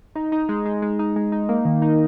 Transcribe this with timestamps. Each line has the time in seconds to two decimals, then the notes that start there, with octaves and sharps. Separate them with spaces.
0.15 D#4
0.32 D#4
0.49 G#3
0.65 G#3
0.82 G#3
0.99 D#4
1.16 G#3
1.32 D#4
1.49 A#3
1.65 D#3
1.82 D#4